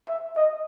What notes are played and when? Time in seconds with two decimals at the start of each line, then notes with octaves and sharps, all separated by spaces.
0.09 E5
0.37 D#5